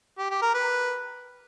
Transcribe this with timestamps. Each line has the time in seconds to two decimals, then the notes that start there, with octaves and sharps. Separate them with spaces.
0.18 G4
0.30 G4
0.42 A#4
0.54 B4